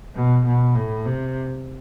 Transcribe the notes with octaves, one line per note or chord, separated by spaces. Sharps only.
B2
B2
A2
C3